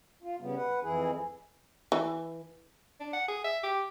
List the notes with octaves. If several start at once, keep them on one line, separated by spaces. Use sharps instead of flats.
F4
C#3 G3 B3
B4 F#5
F2 E3 E4 G#4
E3
D4
F#5
G#4
E5
G4